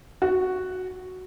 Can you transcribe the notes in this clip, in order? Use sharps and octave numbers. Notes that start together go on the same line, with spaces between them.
F#4